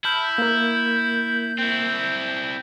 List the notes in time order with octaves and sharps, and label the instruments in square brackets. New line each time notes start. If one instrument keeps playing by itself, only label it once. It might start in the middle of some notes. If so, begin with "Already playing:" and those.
[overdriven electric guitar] E4 [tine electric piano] A5 B5 F6 [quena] G6
[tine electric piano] A#3 A#4
[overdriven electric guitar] C4 E4